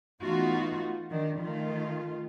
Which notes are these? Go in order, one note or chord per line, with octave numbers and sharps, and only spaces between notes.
E3 A3 B3 D#4 F4 F#4
D#3 D4
D#3 A3 F4